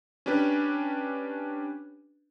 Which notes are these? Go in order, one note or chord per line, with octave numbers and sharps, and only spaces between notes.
C#4 D4 G4 B4